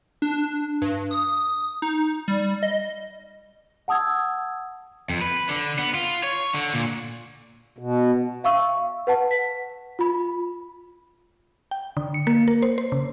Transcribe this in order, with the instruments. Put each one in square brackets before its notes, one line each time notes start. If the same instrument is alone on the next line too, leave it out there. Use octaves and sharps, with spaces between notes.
[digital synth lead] D4
G2
D#6
D#4
G3
D#5
[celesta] F#5 A5 D#6 E6 G#6
[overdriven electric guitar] F2
B4
D3
B3
F4
C#5
D3
A#2
[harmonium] B2
[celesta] E5 F5 C#6 E6
B4 F#5 A5
B6
F4 B5
[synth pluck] G5
D3
C#7
A#3
A#4
C5
C5
C#3